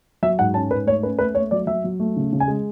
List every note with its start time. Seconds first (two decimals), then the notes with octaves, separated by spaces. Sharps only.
0.22 F#3 E5
0.39 G#2 F#5
0.54 C#4 A5
0.71 G#2 B4
0.86 A3 C#5
1.03 C#4 B4
1.19 A3 B4
1.35 A3 C#5
1.51 F#3 D5
1.67 F#3 E5
1.84 F#3
2.00 A3
2.17 C#3
2.33 C#3
2.40 G#5
2.48 G#3